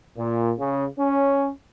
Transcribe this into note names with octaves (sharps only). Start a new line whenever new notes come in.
A#2
C#3
C#4